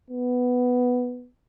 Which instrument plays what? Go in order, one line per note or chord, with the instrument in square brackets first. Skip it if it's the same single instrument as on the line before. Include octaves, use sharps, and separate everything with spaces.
[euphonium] B3